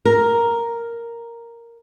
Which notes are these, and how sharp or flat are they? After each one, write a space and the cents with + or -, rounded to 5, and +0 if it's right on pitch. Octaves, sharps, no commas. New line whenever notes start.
A#4 +0